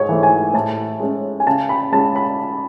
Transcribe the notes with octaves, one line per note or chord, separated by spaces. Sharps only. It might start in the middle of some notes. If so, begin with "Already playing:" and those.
Already playing: G#2 C#5
E3 A3
G#5
A2 A5
G#3 C#4
G#5
C#3 A5
B5
G#3 C#4 A5
B5